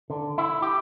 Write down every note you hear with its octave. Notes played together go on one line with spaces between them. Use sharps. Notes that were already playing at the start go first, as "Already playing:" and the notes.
D3
E4
G4